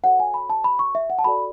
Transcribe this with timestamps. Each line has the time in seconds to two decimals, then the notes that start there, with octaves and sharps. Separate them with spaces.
0.04 F#4 A4 C#5 F#5
0.20 G#5
0.34 B5
0.50 A5
0.64 B5
0.79 C#6
0.95 E5
1.10 F#5
1.19 A5
1.24 F#4 A4 D5 B5